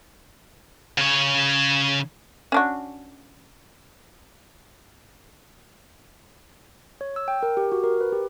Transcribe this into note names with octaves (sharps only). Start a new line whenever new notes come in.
C#3 C#5
C#4 D4 F#4
C#5
E6
G5
A#4
G4
F#4
A#4
B4
G4